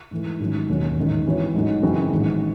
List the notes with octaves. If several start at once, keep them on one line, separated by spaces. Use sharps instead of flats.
G#2 E3 A3
G#1 G#2 D#3 F#3 C#4
E1 D#2 D#3 F#3 C#4
A1 G#2 D#3
G#2 E3 C4 F#4 C#5
A1 G#2 F#3 A3 D#4
F#2 C#3 E3 C4 F#4
A1 G#2 D#3